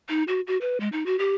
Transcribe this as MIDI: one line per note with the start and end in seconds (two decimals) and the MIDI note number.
0.09 0.23 63
0.28 0.41 66
0.47 0.57 66
0.61 0.78 71
0.80 0.89 56
0.92 1.06 63
1.06 1.19 66
1.19 1.35 67